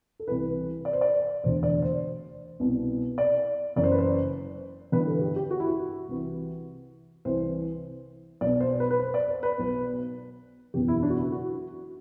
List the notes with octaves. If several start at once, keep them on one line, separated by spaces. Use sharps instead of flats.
A4
C2 C3 E3 B4
D5
C5
D5
E1 D2 D3 C5
D5
C5
C2 B2
D5
F#1 F#2 E3 D5
C5
B4
C5
G1 G2 E3 B4
A4
G4
G4
F#4
E4
F#4
C2 C3 E3
C2 C3 E3 C5
B1 B2 D5
C5
B4
B4
C5
D5
C5
B4
B1 B2
F#1 E2 B2 G4
E4
D4
F#4
E4
F#4